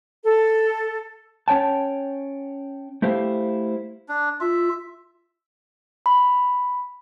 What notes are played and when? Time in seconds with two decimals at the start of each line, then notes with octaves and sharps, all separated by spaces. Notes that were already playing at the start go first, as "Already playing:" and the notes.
0.25 A4
1.48 C#4 C#5 G5 A5
3.02 A3 E4 G4 C5 F5
4.09 D4
4.41 F4 E5
6.06 B5